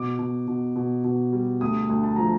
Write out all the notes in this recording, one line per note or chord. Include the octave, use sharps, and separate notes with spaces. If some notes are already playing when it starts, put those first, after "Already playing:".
Already playing: B2 D6
B2
B2
B2
B2
G3
D2 D#6
D2
A5
F3 A#5